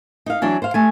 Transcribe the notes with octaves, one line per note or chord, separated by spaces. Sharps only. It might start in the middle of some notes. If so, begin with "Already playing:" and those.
D#4 F5
E3 F#3 D4
C5 F5
A3 G#5